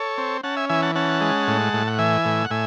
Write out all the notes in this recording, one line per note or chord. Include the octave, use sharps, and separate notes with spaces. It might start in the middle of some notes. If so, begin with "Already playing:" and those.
Already playing: A4 C#5
C4
C#4 F#5 A5
E5 G#5
E3 E5 G#5
F#5 A5
C#4 F#5 A5
G#3
A2
A2
F#5
E3 E5 G#5
A2
F#5
A2 E5 G#5